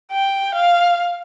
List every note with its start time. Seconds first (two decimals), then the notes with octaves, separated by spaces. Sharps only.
0.12 G5
0.55 F5